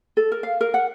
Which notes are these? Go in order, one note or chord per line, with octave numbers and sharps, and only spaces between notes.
A4
A#4
F5
A#4
F#5